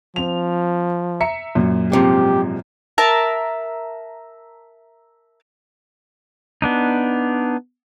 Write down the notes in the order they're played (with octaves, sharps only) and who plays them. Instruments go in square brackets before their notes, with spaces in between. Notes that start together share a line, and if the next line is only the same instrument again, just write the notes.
[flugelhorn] F3 [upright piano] C4 F7
[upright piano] E5 A#5 C#7
F#2 A#2
[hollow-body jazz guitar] G#2 C3 F3 [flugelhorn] G4
[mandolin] A#4 E5 A5
[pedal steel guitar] B3 D4 D#4